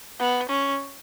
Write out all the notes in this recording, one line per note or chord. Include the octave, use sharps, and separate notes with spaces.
B3
C#4